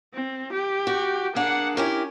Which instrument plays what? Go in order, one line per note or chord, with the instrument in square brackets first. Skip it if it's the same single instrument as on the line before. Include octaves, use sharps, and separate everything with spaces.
[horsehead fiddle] C4
G4
[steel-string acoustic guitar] F#4
[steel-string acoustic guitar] A#3 D4 G#4 [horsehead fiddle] F#5
[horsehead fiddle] C#4 [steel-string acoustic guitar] E4 G4 A#4